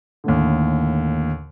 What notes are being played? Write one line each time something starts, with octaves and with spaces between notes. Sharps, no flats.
D#2 A2 D3